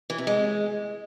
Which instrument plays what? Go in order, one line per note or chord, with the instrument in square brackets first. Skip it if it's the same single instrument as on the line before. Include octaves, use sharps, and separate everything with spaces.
[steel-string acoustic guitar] E3
C3
G#3